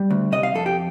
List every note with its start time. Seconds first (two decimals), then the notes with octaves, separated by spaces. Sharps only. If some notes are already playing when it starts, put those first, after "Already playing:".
Already playing: G3
0.10 D2
0.32 C3 D#5
0.43 F5
0.55 F2 A4
0.66 G4